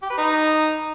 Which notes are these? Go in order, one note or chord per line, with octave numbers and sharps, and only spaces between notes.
G4
B4
D#4